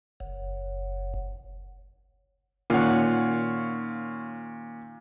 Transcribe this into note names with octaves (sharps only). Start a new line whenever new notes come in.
F#1
A#2 D#3 C#4 F4 C#5 F#5